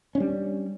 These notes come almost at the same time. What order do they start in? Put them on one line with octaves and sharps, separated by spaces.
C#4 D4 G3